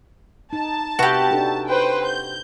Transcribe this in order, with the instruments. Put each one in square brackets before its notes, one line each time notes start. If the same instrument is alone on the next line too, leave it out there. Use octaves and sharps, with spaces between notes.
[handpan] D#4 [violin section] A5
[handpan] C3 B4 E5 [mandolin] F#4 G4
[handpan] D4 D#4 A4
[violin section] B4 C5 G5
G6